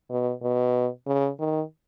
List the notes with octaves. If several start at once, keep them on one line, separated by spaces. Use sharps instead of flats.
B2
B2
C#3
D#3